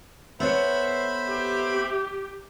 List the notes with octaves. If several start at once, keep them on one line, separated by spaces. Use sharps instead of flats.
B3 A4 C5 C#5 E5 B5
G4